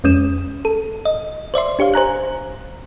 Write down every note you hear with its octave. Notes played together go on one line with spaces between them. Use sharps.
F2 G#3 C#4 D#6 E7
A4
D#5
C5 D5 E5 C6
D4 G4 C#5 F5
C5 G#5 A#5 F#6